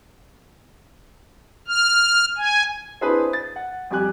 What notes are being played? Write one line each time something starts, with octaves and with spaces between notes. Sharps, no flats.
F6
G#5
C4 D4 E4 G#4 B4
A6
F#5
F2 G3 G4 G#5 F#6